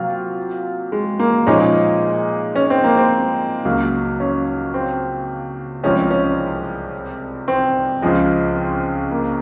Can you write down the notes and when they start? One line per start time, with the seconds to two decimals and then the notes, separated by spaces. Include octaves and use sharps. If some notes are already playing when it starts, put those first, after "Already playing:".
Already playing: C3 F#3 A#3 F4
0.92 G#3
1.20 A#3
1.47 A#2 F3 G#3 C#4 D#4
2.56 C#4
2.70 C4
2.84 A#3
2.97 C4
3.65 C#2 C#3 F#3 A#3
4.20 C#4
4.74 C4
5.83 C2 C3 F3 G#3 C#4
6.11 C#4
7.48 C4
8.02 C#2 C#3 F3 G#3
8.56 C4
9.11 A#3